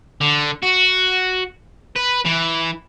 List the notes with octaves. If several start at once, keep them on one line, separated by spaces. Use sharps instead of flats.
D3
F#4
B4
E3